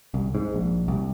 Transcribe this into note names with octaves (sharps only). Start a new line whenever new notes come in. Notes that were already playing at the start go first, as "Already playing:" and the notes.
C2
G#2
A#1
C2